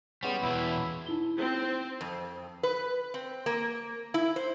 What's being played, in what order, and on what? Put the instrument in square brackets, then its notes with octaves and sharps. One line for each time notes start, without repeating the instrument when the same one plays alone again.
[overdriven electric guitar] G3 [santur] G#3 B3 C#4
[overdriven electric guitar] E2 B2 [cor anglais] E4
[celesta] D#4 E4 G7
[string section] C4
[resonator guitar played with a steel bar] F2
B4
C4
A#3
E4
C5